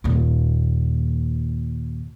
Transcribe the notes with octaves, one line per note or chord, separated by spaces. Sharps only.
D#2 A#2